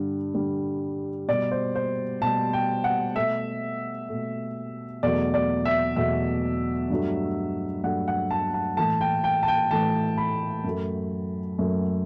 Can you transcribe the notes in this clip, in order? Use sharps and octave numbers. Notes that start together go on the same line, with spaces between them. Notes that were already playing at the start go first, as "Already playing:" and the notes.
Already playing: G2 D3 G3
G2 D3 G3
B2 G3 D5
C5
C5
B2 G3 A5
G5
F#5
B2 A3 E5
B2 A3
E2 B2 F#3 A3 D5
D5
E5
E2 B2 F#3 A3 E5
G2 F#3 A3
G2 F#3 A3 F#5
F#5
A5
A5
A2 E3 A3 A5
G5
G5
A5
G5
A2 E3 A3 A5
B5
F#2 F#3 A3
F#2 F#3 A3